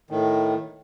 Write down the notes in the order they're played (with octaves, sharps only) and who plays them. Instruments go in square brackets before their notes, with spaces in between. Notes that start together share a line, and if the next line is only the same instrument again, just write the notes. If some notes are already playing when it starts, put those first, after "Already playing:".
[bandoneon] A2 D#3